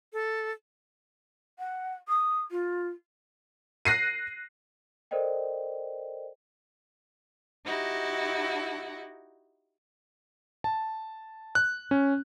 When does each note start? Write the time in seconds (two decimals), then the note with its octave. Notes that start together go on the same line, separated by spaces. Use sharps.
0.13 A4
1.59 F#5
2.08 D#6
2.51 F4
3.85 F#6 A#6 C7 D#7
5.11 A4 A#4 C5 D5 D#5 G5
7.66 D#4 E4 F#4 G4
10.64 A5
11.55 F#6
11.91 C#4